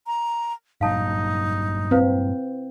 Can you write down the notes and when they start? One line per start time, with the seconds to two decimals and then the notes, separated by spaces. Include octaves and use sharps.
0.07 A#5
0.81 G2 A#2 F#3 D#4 F5 A5
1.91 C4 E4 B4 F5